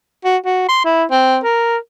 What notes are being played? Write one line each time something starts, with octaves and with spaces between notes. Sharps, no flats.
F#4
F#4
C6
E4
C4
A#4